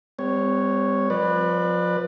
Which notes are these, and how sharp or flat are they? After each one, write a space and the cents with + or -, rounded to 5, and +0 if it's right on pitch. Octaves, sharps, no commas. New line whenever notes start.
G3 +30 C4 -35 C#5 +0
F3 +25 B4 -5 D5 +35